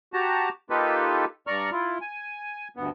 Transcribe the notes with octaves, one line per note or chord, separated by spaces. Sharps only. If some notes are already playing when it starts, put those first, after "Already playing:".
F#4 G4 A5 A#5
A#3 D#4 F4 G4 A4 B4
G2 D5 A#5 C#6 F6
E4 F4
G#5
D2 G2 B3